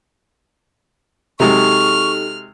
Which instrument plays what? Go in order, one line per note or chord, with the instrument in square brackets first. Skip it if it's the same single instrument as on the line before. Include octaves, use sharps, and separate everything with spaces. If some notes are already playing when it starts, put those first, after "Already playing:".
[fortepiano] C3 F#3 G#3 [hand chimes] D#4 G4 A4 [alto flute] C#6 [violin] F6